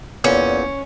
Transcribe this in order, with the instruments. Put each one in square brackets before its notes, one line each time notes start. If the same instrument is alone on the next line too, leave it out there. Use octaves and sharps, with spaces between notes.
[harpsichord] E2 A#2 [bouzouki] C#4